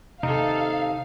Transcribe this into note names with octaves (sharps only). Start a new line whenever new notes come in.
D#2 C3 D#4 A4 F5